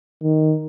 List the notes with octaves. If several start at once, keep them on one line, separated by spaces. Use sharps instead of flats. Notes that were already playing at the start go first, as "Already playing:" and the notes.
D#3